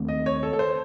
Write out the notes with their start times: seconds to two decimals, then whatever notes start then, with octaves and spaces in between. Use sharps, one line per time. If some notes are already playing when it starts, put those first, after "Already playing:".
Already playing: D#2 D#3 A3 C4
0.08 D#5
0.26 C#5
0.43 A4
0.53 A4
0.59 C5